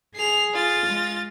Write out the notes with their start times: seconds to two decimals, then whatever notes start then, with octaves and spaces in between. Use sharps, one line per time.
0.15 G#4 C7 F7
0.53 F4 A6
0.87 G#3